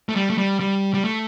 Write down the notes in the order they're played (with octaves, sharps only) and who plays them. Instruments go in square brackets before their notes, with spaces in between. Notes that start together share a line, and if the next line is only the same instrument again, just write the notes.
[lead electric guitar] A3
G3
A3
G3
G3
G3
A3